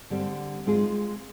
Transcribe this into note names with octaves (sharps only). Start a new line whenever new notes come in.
D3 G3 C4
G#3 C4 F4 G#4